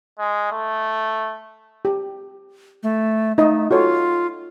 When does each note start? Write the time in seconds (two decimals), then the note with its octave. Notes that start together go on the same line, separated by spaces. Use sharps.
0.18 G#3
0.52 A3
1.85 G4
2.83 A3
3.38 A3 D#4 D#5
3.71 F4 F#4 A4 C#5